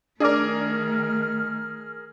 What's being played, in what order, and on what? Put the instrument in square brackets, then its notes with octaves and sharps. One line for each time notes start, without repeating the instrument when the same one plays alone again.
[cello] D#3 A3 [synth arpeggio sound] D4 D5 D6 [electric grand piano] G#4 A#4 [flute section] F6